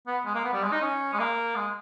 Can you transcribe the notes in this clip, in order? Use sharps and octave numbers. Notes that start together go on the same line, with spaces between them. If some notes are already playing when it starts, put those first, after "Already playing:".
B3
G#3
A#3
B3
G3
G#3
D#4
C#4
G#3
A#3
G#3